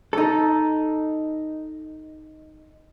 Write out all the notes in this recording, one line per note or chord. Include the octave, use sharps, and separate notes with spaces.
D#4 A4